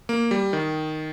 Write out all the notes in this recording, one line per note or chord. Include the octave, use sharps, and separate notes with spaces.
A#3
G3
D#3